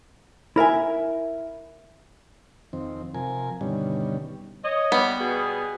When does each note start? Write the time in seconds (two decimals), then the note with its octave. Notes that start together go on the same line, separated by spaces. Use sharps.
0.56 E4 A#4 E5 G#5
2.73 F2 D#3 C4
3.14 C3 F3 A#4 G#5
3.61 G2 B2 D3 D#3 G3 C#4
4.64 C#5 D#5
4.92 G3 B3
5.20 B2 G#4